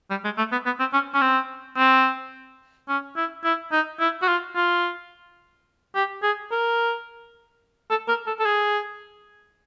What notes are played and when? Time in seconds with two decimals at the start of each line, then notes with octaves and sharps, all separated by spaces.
0.10 G3
0.24 G#3
0.38 A3
0.52 B3
0.66 B3
0.80 C4
0.93 C#4
1.14 C#4
1.21 C4
1.77 C4
2.89 C#4
3.16 E4
3.44 E4
3.72 D#4
4.00 E4
4.22 F#4
4.28 F4
4.56 F4
5.95 G4
6.23 G#4
6.51 A#4
7.90 A4
8.08 A#4
8.27 A4
8.39 A4
8.45 G#4